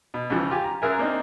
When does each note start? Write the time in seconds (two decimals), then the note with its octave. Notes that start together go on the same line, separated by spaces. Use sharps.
0.14 B2
0.30 C#2 C#3 E3 F3
0.50 F4 G4 G#5
0.64 A#5
0.82 F#2 F#3 G#4 A#4 E5 G#5
0.99 A#3 C4 D4 D#4